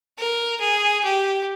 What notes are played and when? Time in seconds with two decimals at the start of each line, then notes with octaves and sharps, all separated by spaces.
0.18 A#4
0.61 G#4
1.05 G4